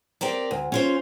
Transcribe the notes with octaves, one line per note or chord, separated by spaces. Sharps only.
C4 G4 A#4 D5
D2
C#4 F4 C5